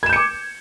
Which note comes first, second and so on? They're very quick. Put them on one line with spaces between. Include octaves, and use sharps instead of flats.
G#6 E7 G6 C#7 D6